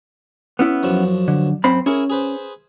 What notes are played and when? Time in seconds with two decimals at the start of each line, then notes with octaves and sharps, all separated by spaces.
0.59 B3 C#4 E4
0.83 F#2 F3 D4
1.28 D3
1.64 F#2 C4 B5
1.86 C#4 E4 G#4 A#4
2.10 G#4 B4 C5